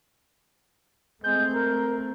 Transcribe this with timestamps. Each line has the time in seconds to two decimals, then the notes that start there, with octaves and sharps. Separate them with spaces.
1.24 G#3 A3 C4 G6
1.54 A#4